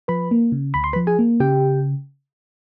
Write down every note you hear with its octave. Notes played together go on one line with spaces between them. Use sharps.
F3 B4 B5
A#3
C#3
D2 B5
C6
B4 B5
F3
G#4 G#5
A#3
C#3 G4 G5